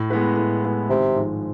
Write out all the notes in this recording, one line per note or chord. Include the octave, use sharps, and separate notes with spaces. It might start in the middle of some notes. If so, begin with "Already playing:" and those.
Already playing: A2
G#3 B3 E4 B4
A2
G#3 B3 E4 B4
G#1 C3
G#2 F3 G#3